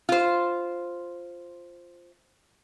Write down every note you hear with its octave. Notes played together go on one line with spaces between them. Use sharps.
F4 C5